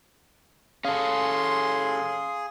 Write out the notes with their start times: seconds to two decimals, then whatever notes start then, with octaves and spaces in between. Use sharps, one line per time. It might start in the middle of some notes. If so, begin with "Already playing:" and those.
0.85 C#4 G#4 A4 F5 C6